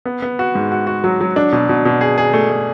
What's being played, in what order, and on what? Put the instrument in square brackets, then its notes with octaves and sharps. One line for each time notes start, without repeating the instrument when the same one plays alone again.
[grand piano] B3
B3
F#4
G#2
F#4
F#4
F#3
F#3
D4
B2
B2
B2
G#4
G#4
A3
A3